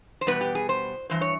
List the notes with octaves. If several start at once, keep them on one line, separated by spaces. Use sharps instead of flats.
C5
E2 B2 G3 B3 B4
G4
G#4
C5
G2 E3 C5
C#5